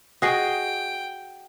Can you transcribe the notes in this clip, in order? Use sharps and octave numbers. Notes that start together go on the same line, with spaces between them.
F#4 G#4 D#5 G5 D#6 A#6 C7